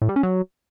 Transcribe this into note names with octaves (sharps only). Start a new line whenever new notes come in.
A2
G3
C#4
F#3